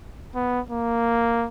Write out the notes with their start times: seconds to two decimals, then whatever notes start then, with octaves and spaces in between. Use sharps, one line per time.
0.35 B3
0.70 A#3